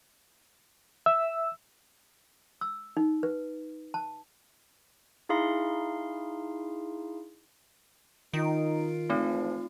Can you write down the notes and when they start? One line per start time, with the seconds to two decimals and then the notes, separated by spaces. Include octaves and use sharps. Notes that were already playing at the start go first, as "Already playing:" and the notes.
1.06 E5 E6
2.61 E6
2.97 D#4
3.23 B4
3.94 A5
5.29 D#4 E4 G#4 F5 C6
8.33 D#3 D#4 F4 D7
9.10 G#1 E3 F3 A3 C4 D#4